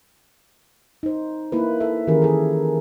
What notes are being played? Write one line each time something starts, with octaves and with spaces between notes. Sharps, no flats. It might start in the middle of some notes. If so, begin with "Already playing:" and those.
D#4 C5
A#3 E4 B4
A4 E5
D#3 E3 C#4 G4 G#4 A#4
G#4 A4